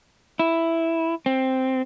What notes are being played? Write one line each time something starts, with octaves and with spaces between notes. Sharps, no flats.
E4
C4